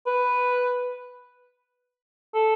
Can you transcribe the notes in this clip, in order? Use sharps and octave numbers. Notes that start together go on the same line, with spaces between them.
B4
A4